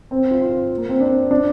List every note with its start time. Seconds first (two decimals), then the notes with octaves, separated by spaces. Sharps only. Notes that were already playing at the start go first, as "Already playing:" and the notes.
0.11 C4
0.31 F4
0.41 F4
0.78 A#3
0.89 C4
1.00 D4
1.31 D4